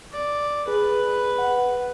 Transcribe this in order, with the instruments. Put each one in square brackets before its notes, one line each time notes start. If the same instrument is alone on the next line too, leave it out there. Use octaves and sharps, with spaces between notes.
[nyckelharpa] D5
[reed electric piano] G#4 [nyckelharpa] B4
[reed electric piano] F#5